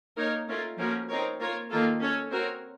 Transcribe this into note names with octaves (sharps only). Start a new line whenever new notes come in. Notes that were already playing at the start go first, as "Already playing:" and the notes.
A#3 D#4 A#4 C#5
A3 C#4 F4 A#4
F3 A#3 C#4 F#4 A#4
C4 D#4 A#4 C#5
A#3 F4 A#4 C#5
D#3 A#3 F4 A4
C#4 A4 C#5
C4 F#4 A#4 C#5